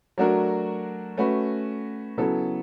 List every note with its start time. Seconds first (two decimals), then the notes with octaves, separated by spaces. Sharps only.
0.18 F#3 A3 D4 F#4 A#4
1.17 A3 C#4 F#4 B4
2.17 C#3 F#3 B3 E4 A4